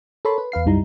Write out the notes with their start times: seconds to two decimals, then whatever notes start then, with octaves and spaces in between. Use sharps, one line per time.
0.25 A4 A#4 C#5 A5 B5 C6
0.38 B4
0.52 E2 B4 F5 C7
0.66 C2 F#2 G3 D#4 E4 A#5